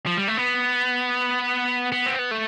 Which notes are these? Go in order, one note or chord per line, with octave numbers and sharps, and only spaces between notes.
F3
G3
A3
B3
B3
C4
B3
A3